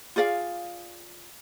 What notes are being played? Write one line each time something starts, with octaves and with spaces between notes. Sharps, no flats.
F4 G#4 D5 F5